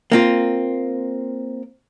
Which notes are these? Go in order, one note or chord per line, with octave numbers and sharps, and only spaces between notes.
A#3 C4 F4